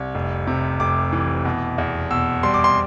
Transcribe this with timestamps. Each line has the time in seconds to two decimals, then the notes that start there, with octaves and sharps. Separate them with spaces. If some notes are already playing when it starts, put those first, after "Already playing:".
Already playing: C2
0.15 F1
0.47 C3
0.80 F1 D6
1.13 E3
1.45 B2
1.78 E2
2.11 B2 E6
2.43 G3 C6
2.54 D6
2.64 C6